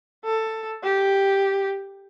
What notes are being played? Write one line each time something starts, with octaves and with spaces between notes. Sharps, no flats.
A4
G4